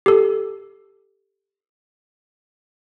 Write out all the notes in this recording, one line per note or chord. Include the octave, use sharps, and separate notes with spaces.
G4 A4